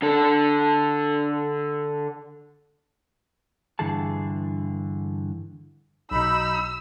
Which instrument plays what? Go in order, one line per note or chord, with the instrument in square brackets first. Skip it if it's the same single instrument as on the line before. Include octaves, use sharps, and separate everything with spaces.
[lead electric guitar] D3 A4
[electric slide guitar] G2 D3 E3 G#4 A5
[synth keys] B1 B2 [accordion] D#4 B5 [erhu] E6